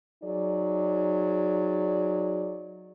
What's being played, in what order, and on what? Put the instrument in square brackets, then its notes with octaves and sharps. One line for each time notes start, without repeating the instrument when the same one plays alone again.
[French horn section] F#3 D#4 G#4 D5